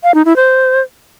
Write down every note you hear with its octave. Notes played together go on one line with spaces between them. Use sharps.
F5
D#4
E4
C5